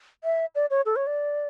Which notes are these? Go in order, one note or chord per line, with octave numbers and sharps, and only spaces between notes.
E5
D5
C#5
A4
C#5
D5